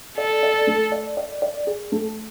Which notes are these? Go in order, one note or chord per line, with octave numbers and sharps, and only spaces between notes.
A4 D5
D5
A3
D5
D5
D5
G#4
A3